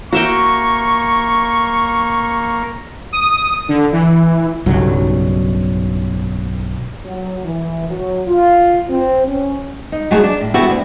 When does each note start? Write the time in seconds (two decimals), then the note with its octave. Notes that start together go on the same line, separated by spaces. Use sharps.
0.12 A#3 F#4 E5 G5 C#6
3.12 D#6
3.69 D3
3.92 E3
4.66 B1 G2 C#3 F#3
7.06 F#3
7.45 E3
7.90 F#3
8.28 F4
8.90 C4
9.27 C#4
9.92 D#4
10.11 F#3 A3 A#3 D#4 F#4 G#4
10.23 D4
10.41 A2
10.54 B3 E4 F#4 G4 A4
10.70 D2